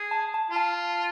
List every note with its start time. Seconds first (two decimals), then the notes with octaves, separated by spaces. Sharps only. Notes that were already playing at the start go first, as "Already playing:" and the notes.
Already playing: G#4
0.11 A5
0.34 A5
0.51 F4
0.56 A5